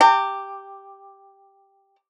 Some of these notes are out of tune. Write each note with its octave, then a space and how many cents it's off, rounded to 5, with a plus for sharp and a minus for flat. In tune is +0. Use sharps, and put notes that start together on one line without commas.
G4 +0 A#5 -35